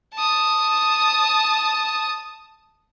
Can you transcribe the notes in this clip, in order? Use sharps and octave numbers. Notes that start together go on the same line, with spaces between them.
A5 D#6